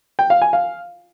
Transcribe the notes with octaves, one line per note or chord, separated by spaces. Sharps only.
G5
F5
G#5
F5